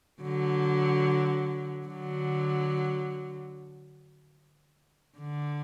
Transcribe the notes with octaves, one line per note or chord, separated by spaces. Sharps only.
D3 F#3
D3 F#3
D3